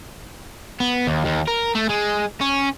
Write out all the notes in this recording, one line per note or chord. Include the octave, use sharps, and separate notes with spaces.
B3
D#2
D#2
A#4
A3
G#3
C#4